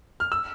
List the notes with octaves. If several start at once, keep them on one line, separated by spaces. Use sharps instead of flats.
F6
E6